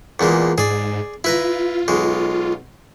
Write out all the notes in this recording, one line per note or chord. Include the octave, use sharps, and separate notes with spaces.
E2 A#2 G#3
G#2 G#4 D5
E4 F4 B4 A#5
B1 G#3